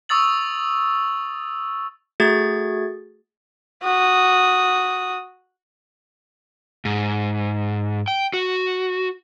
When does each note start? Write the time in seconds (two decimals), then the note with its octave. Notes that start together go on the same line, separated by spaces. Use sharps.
0.09 C#6 D#6 E6 A6 F#7
2.20 A3 F#4 G#4 G#6 A6
3.83 F#4 D#6
6.85 G#2
8.08 G5
8.33 F#4